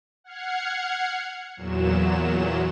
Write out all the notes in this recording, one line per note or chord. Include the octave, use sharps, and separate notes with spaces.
F#5 F6 G#6 C7 C#7
E2 A#2 F#3 E7